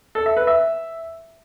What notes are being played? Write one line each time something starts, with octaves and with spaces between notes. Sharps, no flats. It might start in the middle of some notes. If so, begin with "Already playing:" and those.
A4
E5
B4
E5